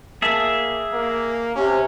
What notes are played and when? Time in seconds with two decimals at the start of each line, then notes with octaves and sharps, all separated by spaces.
0.22 A#3 G#4 E5 A5
0.93 A#3
1.56 C3 C#4